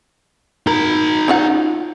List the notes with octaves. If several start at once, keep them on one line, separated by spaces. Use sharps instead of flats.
D#4 A#4 B5
C#4 F4 F#5